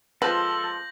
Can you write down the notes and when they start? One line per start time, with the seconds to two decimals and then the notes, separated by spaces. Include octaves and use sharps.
0.22 F3 G#3 C4 A4 B4 G6 A#6 F#7